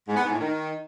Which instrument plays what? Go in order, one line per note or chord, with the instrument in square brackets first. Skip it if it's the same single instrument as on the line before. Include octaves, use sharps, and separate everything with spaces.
[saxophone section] G#2
B3
G#2
A2
D#3